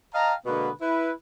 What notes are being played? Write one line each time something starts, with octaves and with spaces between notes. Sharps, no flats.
D#5 F5 G5 A5 A#5
B2 D3 G#3 A#3 B3 B4
E4 B4